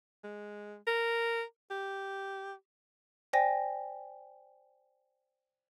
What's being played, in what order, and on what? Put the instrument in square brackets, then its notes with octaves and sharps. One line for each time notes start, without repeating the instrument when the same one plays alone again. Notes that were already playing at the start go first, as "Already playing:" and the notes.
[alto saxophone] G#3
A#4
G4
[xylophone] C5 D5 G5 G#5 A#6